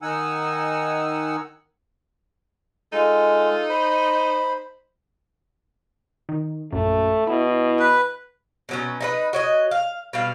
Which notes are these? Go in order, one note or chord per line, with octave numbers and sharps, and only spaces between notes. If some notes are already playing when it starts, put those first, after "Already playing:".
D#3 D#4 F#5 G#5 E6
G#3 D#4 F4 A4
C5 B5
D#3
A#1 F#2 A3
B2 E4
B4
B2 F#3 C#4
D#4 E4 B4
F#4 C#5 D#5
F5
B2 G3 F5